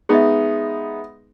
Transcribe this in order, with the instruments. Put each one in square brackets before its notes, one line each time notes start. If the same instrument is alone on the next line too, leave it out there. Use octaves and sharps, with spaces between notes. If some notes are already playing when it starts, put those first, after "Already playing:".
[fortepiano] G#3 B3 D#4 [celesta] G#4 D#5 E5